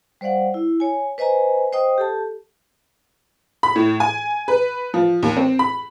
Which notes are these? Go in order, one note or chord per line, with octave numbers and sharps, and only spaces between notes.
G3 C5 D5 F5 F#5
E4
C#5 G#5
B4 C5 D#5 G#5 A#5
C5 D#5 G5 D#6
G4 A4 A5
B5
A2
G#5
B4
F3
D#2
C4
B5